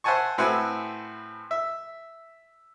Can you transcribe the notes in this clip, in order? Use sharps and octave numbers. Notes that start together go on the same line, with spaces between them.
C5 E5 F#5 G#5 A5 C#6
A2 C4 F#4 B4 E5 G#5
E5